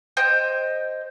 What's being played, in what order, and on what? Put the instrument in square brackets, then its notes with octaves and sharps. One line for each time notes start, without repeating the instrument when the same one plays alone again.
[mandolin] C5 D#5 G5